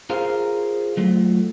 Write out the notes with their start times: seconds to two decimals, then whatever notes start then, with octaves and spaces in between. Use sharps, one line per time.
0.10 F4 G#4 A#4 C5 F5
0.97 F#3 A3 F4